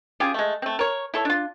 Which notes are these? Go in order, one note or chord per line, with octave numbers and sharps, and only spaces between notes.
C#4 F4 G4 G#4
G#3 A3
A3 C4
A#4 C#5
E4 A4 C#5
D4 F4